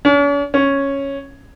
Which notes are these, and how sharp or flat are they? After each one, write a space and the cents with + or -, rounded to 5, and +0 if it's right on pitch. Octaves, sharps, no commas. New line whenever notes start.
C#4 +45
C#4 -5